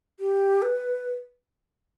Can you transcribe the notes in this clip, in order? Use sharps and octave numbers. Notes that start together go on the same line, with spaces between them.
G4
B4